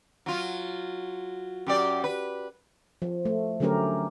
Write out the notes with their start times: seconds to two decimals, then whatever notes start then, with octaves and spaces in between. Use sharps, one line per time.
0.26 F#3 F4
1.67 F#2 G4 D5
2.04 B4
3.02 F3
3.25 A3
3.60 D3 F#3 A3 C#4 G4 A#4